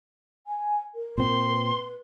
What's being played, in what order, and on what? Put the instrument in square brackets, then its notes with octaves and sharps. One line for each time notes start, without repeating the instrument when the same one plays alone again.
[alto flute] G#5
A#4
[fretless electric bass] A#2 C4 [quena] C6
[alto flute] B4